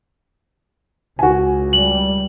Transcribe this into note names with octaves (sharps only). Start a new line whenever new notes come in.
C#2 F#4 G#5
G3 F#7